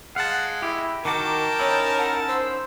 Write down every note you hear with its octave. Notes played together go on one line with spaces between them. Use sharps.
G#3 F5 F#5 A5
E4 G4
D#3 F#4 A#4 G5 A5 D6
C#4 D#4 E4 C#5
F#5 A5
C5 E6